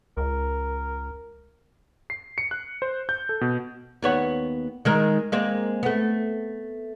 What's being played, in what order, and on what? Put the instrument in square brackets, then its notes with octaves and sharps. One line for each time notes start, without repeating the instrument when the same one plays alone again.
[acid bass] C#2 [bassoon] A#4
[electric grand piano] C7
C#7
F#6
C5
G6
A4
B2
[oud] D#2 B3 C#5
D#3 G#3 A#4
G#3 A#3 C4
A3 B3